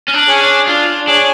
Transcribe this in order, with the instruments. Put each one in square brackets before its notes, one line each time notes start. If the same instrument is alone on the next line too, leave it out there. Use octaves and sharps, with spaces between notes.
[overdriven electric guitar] C#4
D4
[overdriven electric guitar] C#4 [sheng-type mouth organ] G#4 C#5 G#5
[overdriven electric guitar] D4
[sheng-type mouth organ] D4 [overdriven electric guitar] F4
[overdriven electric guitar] D4 [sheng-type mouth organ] G#4 C#5 G#5